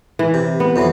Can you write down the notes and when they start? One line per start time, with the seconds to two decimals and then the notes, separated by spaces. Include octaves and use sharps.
0.19 E3
0.34 C3
0.60 B3
0.76 F2 E3 F#3